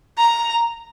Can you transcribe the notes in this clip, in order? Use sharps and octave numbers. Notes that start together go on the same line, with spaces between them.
A#5